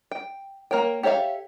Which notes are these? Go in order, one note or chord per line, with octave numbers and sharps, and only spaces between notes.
G5
A#3 A#4 C#5 G5
G4 A4 C#5 E5 F5